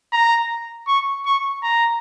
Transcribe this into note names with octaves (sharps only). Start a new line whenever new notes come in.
A#5
C#6
C#6
A#5